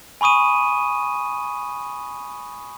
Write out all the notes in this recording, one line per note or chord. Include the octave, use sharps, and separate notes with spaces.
G#5 B5 C#6 D#6 D#7